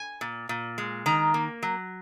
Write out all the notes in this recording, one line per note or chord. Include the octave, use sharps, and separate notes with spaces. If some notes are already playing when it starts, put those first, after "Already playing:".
Already playing: G#5
A#2
A#2
G#3
D#3 A#5
A#3
F#3